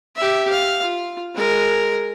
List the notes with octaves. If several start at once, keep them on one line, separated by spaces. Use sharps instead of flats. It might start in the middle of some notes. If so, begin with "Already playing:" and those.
G4 E5
F5
F4
G#3 A#4